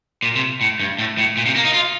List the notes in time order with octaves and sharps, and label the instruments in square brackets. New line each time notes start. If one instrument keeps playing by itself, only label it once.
[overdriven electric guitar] A#2
C3
A2
G2
A2
A2
A#2
C3
A#3
D#4
F4